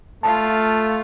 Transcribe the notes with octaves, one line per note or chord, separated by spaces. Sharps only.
A3 F4 A5